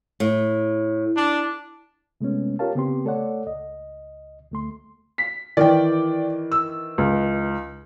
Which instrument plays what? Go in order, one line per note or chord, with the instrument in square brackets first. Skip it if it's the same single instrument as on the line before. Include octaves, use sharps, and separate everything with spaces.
[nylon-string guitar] A2
[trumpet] D4
[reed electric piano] C3 G#3 A3 B3 C#4
F4 G4 A#4 C#5 F5 A5
C#3 B3 C4 G4 C6
A3 A4 C#5 D5 F#5
C#2 D#5
D2 A3 C6
[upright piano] B6
[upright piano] D#3 E3 [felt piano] D5 G5
[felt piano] E6
C#2